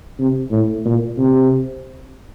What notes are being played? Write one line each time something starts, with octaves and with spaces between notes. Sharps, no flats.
C3
A2
A#2
C3